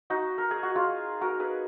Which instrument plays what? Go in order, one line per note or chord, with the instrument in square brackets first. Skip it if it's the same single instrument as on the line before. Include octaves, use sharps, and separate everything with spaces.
[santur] D#4 F#4
A#4
G#4
F#4
F4 G#4
F#4 A#4
G#4 B4